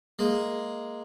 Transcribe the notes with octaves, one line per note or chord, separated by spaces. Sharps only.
G#3 A#3